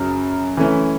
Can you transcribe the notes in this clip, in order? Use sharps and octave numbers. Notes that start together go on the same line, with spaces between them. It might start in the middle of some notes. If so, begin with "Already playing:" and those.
Already playing: F#2 C#3
E3 A3 C#4 E4